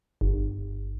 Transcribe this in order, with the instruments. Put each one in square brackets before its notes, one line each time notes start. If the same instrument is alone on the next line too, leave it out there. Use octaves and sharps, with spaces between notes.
[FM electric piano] G1